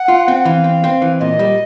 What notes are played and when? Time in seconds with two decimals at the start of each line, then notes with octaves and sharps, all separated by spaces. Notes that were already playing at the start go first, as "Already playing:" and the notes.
Already playing: F#5
0.08 F4
0.28 C4
0.35 F#5
0.45 E3 F5
0.64 C4
0.84 C4
1.02 E3
1.20 A#2 D#5
1.39 G3